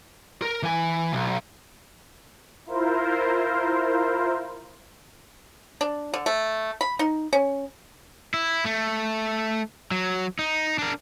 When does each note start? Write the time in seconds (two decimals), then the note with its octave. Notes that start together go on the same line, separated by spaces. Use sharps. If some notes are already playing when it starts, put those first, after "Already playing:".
0.42 A#4
0.63 E3 G#5
1.13 B1
2.66 E4 F4 A#4 C5
5.81 D4
6.14 D3
6.26 A3
6.81 B5
6.99 D#4
7.33 C#4
8.34 E4
8.65 A3
9.91 F#3
10.39 D#4
10.79 D4 A#4